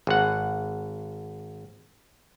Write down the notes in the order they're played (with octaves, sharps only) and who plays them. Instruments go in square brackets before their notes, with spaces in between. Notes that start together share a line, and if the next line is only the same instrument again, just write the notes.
[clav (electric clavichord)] G#1 F#5